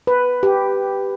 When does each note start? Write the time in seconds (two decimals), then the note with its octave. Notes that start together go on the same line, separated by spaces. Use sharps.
0.07 B4
0.43 G4